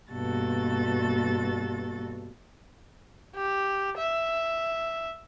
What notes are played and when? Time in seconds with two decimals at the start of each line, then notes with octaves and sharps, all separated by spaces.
0.12 G2 B2 A#3 F#4 A4 A6
3.35 G4
3.98 E5